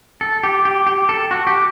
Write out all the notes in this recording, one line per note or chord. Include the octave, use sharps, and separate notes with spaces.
A4
G4
G4
G4
A4
F#4
G4